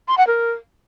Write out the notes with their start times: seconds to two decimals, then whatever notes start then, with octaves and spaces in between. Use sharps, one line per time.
0.08 C6
0.18 F#5
0.27 A#4